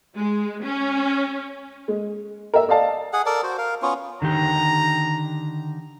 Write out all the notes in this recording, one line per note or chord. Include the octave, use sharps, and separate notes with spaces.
G#3
C#4
G#3
A#4 E5
A4 D5 D#5 F5 A5
G#4 F#5
A4 A#4 D5
F#4 C5
A#4 F5
B3 C#4 F4 C#5
D3 D#3 G4 A#5